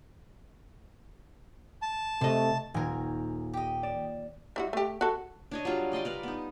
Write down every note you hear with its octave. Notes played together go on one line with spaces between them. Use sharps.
A5
C3 A3 D#5
D#1 A#4 G#5
G4 D#5
D5 E7
G3 E4 F#4
A3 G4
F#4 A4
D4 C#5 D#5
F#3 G3 F4
D5 D#5 G5 C6
A#4 B4 D5
B3 D#4